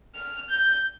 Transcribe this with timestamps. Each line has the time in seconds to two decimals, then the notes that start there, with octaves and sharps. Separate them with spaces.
0.15 F6
0.50 G6